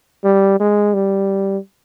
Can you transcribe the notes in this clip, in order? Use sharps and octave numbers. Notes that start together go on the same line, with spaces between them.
G3
G#3
G3